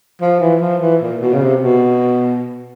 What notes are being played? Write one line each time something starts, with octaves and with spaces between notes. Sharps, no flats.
F3
E3
F3
E3
A#2
B2
C#3
C3
B2